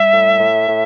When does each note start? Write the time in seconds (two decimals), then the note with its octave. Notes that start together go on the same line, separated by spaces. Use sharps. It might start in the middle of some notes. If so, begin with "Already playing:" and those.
Already playing: G3 E5
0.11 A2
0.39 A2
0.67 A2